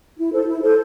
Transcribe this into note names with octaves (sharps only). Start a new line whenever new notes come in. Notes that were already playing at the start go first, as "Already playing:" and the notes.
E4
A4 C5
E4
A4 C5